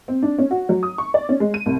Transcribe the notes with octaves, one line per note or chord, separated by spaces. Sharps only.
C4
D4
C#4
F#4
F#3
D#6
C#6
D5
C#4
G#3
D#7
C2